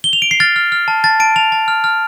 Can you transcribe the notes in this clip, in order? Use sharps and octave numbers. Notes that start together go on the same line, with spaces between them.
G7
F7
D7
C7
F6 A6
F6
F6
A5
A5 A6
A5 D7
A5 F7
A5
F6
F6